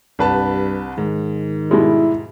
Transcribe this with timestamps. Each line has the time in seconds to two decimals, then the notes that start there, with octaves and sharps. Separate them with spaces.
0.19 C2 G2 B4 A5
0.98 G#2 D#3
1.71 B2 G3 G#3 E4